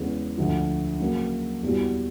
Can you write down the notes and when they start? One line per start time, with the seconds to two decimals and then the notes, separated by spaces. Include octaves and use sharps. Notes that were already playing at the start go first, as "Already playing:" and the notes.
Already playing: E2 C#3 E3 G#3 B3
0.37 D2 D3 F3
1.00 C#3 F#3 A#3
1.63 E2 B2 G3